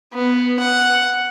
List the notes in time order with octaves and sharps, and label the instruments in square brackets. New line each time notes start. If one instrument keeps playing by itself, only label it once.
[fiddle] B3
F#5